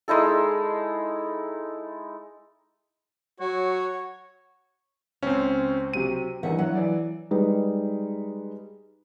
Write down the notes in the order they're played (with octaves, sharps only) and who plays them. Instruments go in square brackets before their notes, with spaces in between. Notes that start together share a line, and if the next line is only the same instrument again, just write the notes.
[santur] G#3 D#4 E4 A4
[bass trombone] F#3 [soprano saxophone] F#4 [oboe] C#5
[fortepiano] C#2 [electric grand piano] C4 C#4 [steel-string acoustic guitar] C5
[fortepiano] C3 F#3 G4 [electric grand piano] D#7
[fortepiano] E2 G2 E3 [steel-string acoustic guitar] D#3 E5 F#5
[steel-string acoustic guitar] F#3 [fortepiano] E4 C#5 F#5
[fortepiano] E3 D5
[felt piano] G3 G#3 D#4 B4